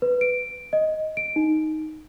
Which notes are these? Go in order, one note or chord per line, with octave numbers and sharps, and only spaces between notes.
B4
D7
D#5
D7
D#4